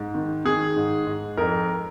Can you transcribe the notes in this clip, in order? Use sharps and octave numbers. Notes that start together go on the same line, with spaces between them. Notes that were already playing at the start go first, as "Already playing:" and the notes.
Already playing: G#2
D#3
D#3 G#4
G#2
G#2
F2 A#4